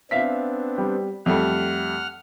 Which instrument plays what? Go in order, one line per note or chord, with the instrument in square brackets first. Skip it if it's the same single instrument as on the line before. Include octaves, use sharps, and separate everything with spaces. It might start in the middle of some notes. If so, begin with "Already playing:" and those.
[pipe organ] B3 C4 D4 [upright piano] E5 F5 B6
[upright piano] G3
[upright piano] F2 G3 A3 [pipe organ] F#5 F6